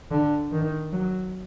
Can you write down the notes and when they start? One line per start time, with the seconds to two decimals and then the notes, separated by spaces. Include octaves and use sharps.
0.11 D3
0.52 D#3
0.92 F#3